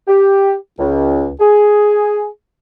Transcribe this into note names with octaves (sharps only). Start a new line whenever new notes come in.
G4
C#2
G#4